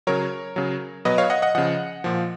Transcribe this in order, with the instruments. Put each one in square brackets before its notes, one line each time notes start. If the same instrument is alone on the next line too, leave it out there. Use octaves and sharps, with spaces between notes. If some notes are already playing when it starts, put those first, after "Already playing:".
[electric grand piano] C#3 F#3 A#4 C#5
C#3 F#3
B2 F#3 B4 D#5
C#5 F5
D#5 F#5
D#5 F#5
C#3 F3 D#5 F#5
A#2 F3